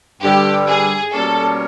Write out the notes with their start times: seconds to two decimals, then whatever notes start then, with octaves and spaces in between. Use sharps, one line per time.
0.22 G2 D3 G3 G4
0.68 G#4
1.12 B2 G3 A#3 C#4 A4